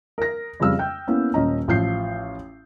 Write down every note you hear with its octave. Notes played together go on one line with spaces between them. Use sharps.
A#4 A#6
F2 C#3 G3 E6 F6
G5 G6
A#3 B3 C#4 E4
D#1 C#4 D#5 A#5
A1 F3 F5 G6 C7